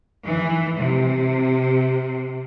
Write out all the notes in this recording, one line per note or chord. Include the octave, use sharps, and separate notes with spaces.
E3
C3